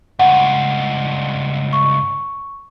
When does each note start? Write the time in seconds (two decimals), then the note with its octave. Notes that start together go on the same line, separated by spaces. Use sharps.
0.19 C#2 G2 F#5
1.73 C#6